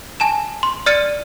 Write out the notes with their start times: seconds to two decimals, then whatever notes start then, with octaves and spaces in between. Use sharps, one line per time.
0.20 G#5 A5 E7
0.63 C6
0.86 D5 F6 A6 C#7 D#7